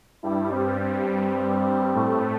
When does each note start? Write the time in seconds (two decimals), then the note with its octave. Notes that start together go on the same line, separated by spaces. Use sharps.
0.23 G2 G3 E4
0.52 C4
0.81 C4
1.09 C4
1.94 A2 A3